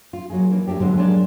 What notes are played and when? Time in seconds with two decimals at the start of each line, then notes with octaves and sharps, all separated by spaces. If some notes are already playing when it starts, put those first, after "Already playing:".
0.13 F4
0.30 F#3 A#3 D#4 G#4
0.50 E3 A#3 D4
0.67 F#3 A3 D4 G4
0.80 G#2 B2 D3 F3 F#3 G#3
0.97 F#3 G#3 A#3 D4 D5 F5